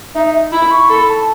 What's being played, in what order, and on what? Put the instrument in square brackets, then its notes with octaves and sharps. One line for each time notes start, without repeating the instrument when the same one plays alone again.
[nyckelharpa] D#4 [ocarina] E5
[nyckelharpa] E4 [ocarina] B5
[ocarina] C#6
[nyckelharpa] A4 [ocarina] B5
[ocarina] A5